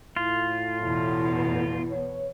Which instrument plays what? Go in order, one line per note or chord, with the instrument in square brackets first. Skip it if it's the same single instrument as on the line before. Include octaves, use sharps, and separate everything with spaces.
[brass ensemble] A2 [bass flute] E4 [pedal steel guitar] F4
[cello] E2 B2 [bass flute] E4
[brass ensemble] B4 C#5